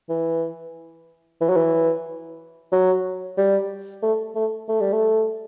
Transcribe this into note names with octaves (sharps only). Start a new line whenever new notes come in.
E3
E3
F#3
E3
F#3
G3
A3
A3
A3
G3
A3